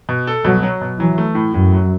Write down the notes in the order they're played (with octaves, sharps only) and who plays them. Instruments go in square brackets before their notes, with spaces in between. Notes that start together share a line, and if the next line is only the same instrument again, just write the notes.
[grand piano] B2
A4
[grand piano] B2 [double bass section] F#3
[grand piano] F#3
B2
[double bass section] E3 [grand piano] F#3
[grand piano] A3
A2
[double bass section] F#2 [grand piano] A2
[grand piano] F#3